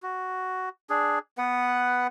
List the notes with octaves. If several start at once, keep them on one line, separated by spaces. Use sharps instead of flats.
F#4
D4 G#4
B3 B4 F#5